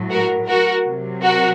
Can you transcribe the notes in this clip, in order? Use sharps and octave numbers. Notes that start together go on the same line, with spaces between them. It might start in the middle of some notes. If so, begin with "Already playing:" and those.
Already playing: A2 F#3
F#4 A#4
F#4 A#4
C3 F#3
F#4 A#4